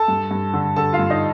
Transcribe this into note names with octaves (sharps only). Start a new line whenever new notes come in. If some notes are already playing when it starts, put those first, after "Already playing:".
Already playing: A4 A5
G2
G2
D3
D3 A4 A5
F4 F5
G2
D#4 D#5